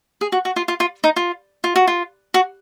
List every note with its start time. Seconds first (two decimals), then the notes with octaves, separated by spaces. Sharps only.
0.21 G#4
0.32 F#4
0.45 F#4
0.56 F4
0.68 F4
0.80 F4
1.04 D#4
1.16 F4
1.64 F4
1.76 F#4
1.87 F4
2.34 F#4